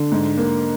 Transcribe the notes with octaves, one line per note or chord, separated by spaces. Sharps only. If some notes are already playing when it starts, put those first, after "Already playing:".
Already playing: D3
G#2
A#3